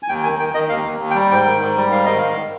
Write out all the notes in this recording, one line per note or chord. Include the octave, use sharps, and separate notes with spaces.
G#5
D#2 G5
D#3 G#5
D#3 G5
D#3 D#5
D#2 F5
D#2
D#2
G5
G3
G#2 G5
D#3
G#2
G3
G#2 F5
D#3 D#5
G#2 F5